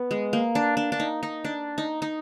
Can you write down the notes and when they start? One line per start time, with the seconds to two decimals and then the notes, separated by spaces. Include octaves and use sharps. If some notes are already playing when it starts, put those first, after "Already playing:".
Already playing: B3
0.11 G#3
0.33 A#3
0.55 D4
0.77 D4
0.92 D4
1.00 D#4
1.23 D#4
1.45 D4
1.78 D#4
2.02 D#4